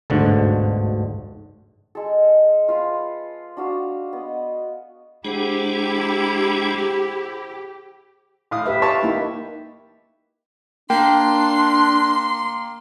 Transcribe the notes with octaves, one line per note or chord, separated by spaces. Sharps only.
G1 D2 G#2 B2 D3
G#3 A4
F4 B4 F5
D4 F#4 F5
B3 D#5
G#3 D4 E4 G4 G#4 C5 F#5
A2 F5 D#6
G4 B4 E5
F4 C#5 A5
A#3 D#4 E4
A#3 D4 G5 C6